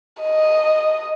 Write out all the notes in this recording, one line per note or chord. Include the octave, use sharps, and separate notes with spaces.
D#5